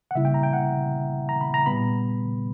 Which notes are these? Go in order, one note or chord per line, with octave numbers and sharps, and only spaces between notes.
F#5
C#3 G3 A#3 E4 E5
G5
A#5
G5
F#5
A#5
B5
A#5
A#2 G3 B3 B5